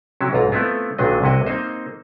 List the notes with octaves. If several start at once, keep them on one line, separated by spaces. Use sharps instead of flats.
C3 F#3 C#4 E4
B1 G#2 F4 A#5
A3 B3 C4 E4 F4
B1 A#2 D#3 F#3 D4 D#5
C2 C3 E4 F#4 D#5
A#3 C4 D#4 C5